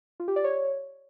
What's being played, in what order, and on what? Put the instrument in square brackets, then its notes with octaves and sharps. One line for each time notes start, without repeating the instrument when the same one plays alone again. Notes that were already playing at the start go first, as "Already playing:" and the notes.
[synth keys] F4
G4
D5
C#5